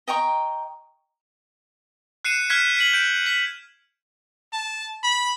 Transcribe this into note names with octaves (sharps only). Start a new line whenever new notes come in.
D#5 G5 A#5 C#6
F#6 C7 C#7 D#7 E7
F6 F#6 G#6 B6 C7
B6 D7 F#7
G6 D7
B6
A5
B5